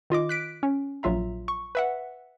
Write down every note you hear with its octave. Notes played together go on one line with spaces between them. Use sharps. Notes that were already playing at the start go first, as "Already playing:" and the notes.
D#3 F4 D#5 D6
F#6 B6 D7
C#4
A#1 F#3 F4 E5 A#5
C#6
B4 E5 F#5